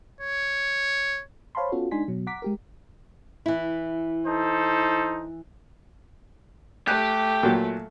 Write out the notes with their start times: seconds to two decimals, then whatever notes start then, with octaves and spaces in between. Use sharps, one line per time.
0.21 C#5
1.55 C5 C#5 F5 A5 B5 C6
1.72 B3 C#4 F4 F#4 A4
1.91 G#3 D4 D#4 G#5 C6 B6
2.08 B2 F#3
2.27 F#5 A#5 D6 B6
2.42 G#3 G4 A#4
3.46 E3 E4
4.26 D#4 A4 C5
6.88 A3 G4 F#6
7.43 A#2 F#3